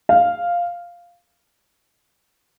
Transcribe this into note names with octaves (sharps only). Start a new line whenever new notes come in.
F5